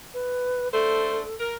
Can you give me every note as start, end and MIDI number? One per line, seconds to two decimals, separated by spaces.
0.14 0.68 71
0.73 1.24 57
0.73 1.24 62
0.73 1.34 69
0.73 1.24 72
1.40 1.55 70